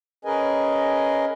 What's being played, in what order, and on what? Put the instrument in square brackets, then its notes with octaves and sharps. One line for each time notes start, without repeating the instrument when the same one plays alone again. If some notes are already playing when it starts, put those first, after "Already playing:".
[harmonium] C#4 G#4 A#4 B4 D#5 G#5